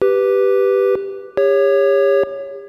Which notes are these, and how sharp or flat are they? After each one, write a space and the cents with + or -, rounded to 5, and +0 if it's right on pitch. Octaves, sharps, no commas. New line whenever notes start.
G4 +0 B4 +0
G4 +40 C#5 +0